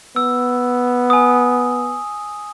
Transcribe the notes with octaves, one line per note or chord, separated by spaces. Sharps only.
B3 E6
G#5 D#6